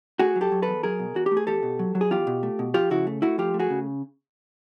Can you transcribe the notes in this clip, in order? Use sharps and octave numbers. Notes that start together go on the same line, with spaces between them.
A3 F#4 G#4
F#3
G4 A4
F#3
E2 A4 B4
F#3 G#4 A#4
B2
E2 F#4
G4
A3
G#4
E2 G4 A4
B2
F#3
F#3
G#4
E2 F4 G4
B2
A3
B2
F3 F4 G4
C#3 E4 F#4
A3
A3 E4 F#4
F3 F4 G4
A3
F#4 G#4
C#3